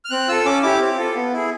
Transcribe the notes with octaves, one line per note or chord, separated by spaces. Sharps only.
F6
C4 F#6
F4 A4 E6
C#4 D6
E4 G4 D6
C4
F4 A4
B3
E4 G#4